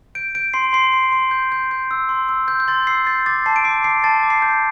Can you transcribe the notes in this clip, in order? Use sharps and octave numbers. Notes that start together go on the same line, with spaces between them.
G6 D7
G6 D7
C6 C7
C6 C7
C6
C6
G6
G6
G6
E6
C6
E6
G6
G6
C6 A6
E6 C7
G6 A6
D6 A6
A5 C7
D7
D6 C7
A5 C7
A5 A6
D6
C7
G6